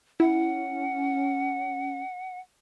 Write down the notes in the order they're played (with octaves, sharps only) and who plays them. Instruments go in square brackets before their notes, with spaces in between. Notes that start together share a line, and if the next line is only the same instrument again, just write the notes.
[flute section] C#4 [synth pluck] E4 [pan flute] F#5